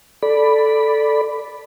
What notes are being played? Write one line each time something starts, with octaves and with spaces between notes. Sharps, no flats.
A4 D5 B5